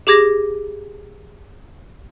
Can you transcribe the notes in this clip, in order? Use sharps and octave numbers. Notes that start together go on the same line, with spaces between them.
G4 G#4 D6 G#6 A#6